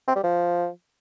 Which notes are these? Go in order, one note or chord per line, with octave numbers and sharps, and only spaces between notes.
C4
G3
F3